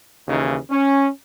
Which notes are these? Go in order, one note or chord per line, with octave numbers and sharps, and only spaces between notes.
D#2 C#3 E3 D#4
C#4